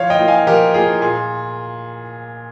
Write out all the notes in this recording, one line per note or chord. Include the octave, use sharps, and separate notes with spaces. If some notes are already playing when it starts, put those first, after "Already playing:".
Already playing: F3 C#5 F5
D#5 G5
A#3 F4
F5 G#5
F3 G4 A#4
A#3 F4 G#4
A#2 G#4